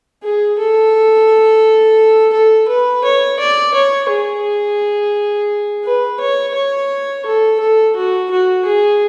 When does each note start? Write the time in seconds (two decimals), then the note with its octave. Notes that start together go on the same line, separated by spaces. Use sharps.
0.23 G#4
0.58 A4
2.33 A4
2.68 B4
3.04 C#5
3.40 D5
3.74 C#5
4.10 G#4
5.85 B4
6.20 C#5
6.54 C#5
7.26 A4
7.60 A4
7.96 F#4
8.31 F#4
8.65 G#4